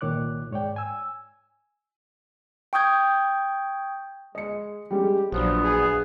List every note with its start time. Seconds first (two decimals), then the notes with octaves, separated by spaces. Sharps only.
0.01 C2 A#2 D#3 C#5 D6 F#6
0.51 G#2 C#5 D5 G5
0.76 G#5 E6
2.73 G5 C#6 D#6 G6 G#6
4.35 G#3 D#5 C#7
4.91 G3 G#3 C#4 G4
5.32 A#1 F3 F#3 B3 D4
5.64 G#4